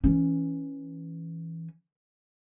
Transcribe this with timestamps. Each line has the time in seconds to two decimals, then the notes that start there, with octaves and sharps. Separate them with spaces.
0.04 E3 C#4